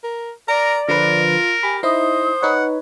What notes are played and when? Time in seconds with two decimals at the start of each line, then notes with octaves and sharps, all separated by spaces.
0.03 A#4
0.48 A#4 D5 A#5
0.88 D3 F3 F4 A#4 B4
1.63 G4 G#5 B5
1.83 D#4 E4 C5 D#5 D#6
2.42 D#4 B4 C#5 F#5